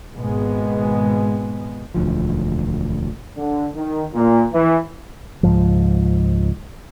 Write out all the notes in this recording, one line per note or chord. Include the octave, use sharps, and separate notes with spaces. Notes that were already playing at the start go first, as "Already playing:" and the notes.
G#1 B2 G#3 B3
E1 D2 F3
D3
D#3
A#2
E3
C#2 G#2 F3